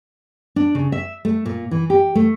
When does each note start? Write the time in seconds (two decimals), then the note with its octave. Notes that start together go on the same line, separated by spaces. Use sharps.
0.56 D4
0.75 C#3
0.92 E5
1.25 A3
1.46 A#2
1.71 E3
1.90 G4
2.15 A3